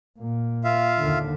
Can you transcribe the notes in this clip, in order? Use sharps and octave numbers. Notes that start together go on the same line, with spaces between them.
A#2 A#3
F4 E5 F5
D#2 D3